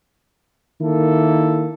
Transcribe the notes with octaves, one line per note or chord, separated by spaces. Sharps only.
D#3 A#3 E4 A4